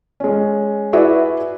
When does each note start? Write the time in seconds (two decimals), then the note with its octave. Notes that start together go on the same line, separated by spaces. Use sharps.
0.20 G#3 C#4
0.93 E4 F#4 G#4 B4 D5 E5